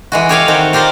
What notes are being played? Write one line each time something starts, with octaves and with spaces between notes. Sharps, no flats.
E3 G#3 F#4
G4 A4 C#5 D5 F5 G5
D#3 C4 F#4
F4 G4 A#4 C5 D5 F5